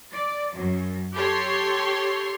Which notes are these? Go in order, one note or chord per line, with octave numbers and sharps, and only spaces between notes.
D5
F#2
G4 A4 C#5 C6